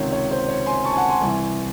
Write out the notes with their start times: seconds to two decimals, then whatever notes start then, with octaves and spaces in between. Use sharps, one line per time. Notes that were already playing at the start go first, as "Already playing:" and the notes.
Already playing: C#2 C3 D#3 C#5
0.12 C#5
0.31 C5
0.48 C#5
0.66 G#5 C6
0.84 A5 C#6
0.93 G#5
0.97 F#5 A5
1.09 G#5 C6
1.21 C2 C3 E3